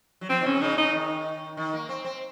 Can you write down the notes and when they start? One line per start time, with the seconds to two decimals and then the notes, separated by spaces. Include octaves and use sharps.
0.21 F#3
0.29 F3 C4
0.41 D#3
0.46 C#3 C#4
0.61 C#3 D#4
0.77 C#3 D#4
0.93 D#3
1.57 D#3
1.73 A#3
1.89 C4
2.05 C4